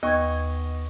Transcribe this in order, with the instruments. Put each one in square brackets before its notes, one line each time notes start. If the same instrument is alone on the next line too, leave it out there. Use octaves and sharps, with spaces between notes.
[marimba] D#2 G#6 [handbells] B3 C#6 [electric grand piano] D#5